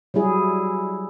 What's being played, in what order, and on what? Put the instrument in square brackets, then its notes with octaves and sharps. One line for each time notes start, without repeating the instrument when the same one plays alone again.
[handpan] F#3 G3 E4 G#4